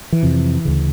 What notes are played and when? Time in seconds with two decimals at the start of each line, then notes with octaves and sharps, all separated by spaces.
0.12 E3
0.23 F2 C3
0.65 D2 C#3